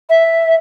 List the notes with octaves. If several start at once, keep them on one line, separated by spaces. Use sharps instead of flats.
E5